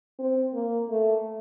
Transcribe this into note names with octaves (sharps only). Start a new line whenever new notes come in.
C4
A#3
A3